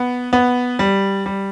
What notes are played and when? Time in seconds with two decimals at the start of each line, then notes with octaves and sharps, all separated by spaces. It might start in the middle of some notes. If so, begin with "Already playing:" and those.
Already playing: B3
0.33 B3
0.79 G3
1.26 G3